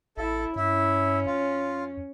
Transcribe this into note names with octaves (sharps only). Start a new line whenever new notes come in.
A1 E4 A4
G2 C#4 E4
F2 F4